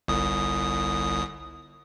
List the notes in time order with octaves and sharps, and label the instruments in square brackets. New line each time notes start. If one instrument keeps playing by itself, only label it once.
[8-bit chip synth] G1 C2 D#6